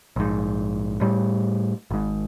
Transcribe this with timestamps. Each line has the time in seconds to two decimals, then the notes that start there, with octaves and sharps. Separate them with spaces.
0.16 A#1 G#2
1.01 A2 G3
1.91 G#1 G#2